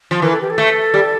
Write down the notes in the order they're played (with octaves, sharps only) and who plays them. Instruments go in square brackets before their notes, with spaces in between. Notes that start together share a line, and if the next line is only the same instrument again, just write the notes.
[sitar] F3
[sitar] E3 [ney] A#4
[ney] A4
G4
A4
[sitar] A3
G3